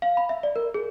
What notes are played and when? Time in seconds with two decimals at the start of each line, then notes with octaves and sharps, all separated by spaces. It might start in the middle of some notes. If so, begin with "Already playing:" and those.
0.02 F5
0.17 B5
0.29 E5
0.43 D5
0.56 A#4
0.74 G#4